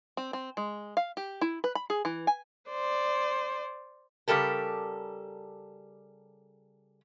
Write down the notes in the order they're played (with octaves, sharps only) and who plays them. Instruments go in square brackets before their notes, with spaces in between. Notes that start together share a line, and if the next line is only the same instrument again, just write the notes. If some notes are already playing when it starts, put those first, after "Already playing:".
[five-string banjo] C4
C4
G#3
F5
G4
E4
B4
B5
G#4
E3
G#5
[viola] C5 D5
[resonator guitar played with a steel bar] C#3 G3 G4 A4 A#4